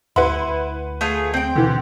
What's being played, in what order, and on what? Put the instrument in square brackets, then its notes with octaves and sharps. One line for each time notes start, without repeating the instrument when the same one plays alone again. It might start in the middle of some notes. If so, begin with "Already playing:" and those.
[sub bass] D2 [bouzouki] E4 [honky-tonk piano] B4 F#5 C6
[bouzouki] A3 F4 G#4
C4 G5
[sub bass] B2 [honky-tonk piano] D3 E3